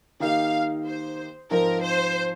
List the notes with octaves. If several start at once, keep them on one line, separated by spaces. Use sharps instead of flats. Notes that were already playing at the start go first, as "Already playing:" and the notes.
D#3 A#3 D#4 G4 F5
C5
G#2 F3 C4 A#4
C5